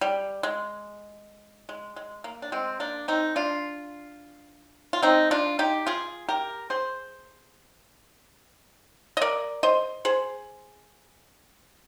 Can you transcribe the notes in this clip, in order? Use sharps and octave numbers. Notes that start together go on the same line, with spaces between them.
G3
G#3
G#3
G#3
A#3
D4
G#3 C4
A#3 D4
C4 D#4
D4 F4
F4
C4 D#4
D4 F4
D#4 G4
F4 G#4
G4 A#4
G#4 C5
D#5
A#4 D5
C5 D#5
G#4 C5